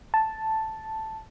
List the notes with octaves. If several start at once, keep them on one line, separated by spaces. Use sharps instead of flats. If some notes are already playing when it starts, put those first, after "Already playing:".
A5